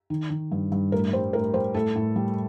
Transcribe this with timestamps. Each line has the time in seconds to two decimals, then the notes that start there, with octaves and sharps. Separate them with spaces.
0.10 D#3
0.30 D#3
0.52 G2
0.72 G2
0.92 A2 A#4
1.13 G3 C5
1.33 A2 A#4
1.54 G3 C5
1.74 A2 A4
1.95 A2
2.16 G3